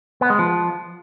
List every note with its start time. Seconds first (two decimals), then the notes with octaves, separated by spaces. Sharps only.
0.21 B3
0.30 G#3
0.39 F3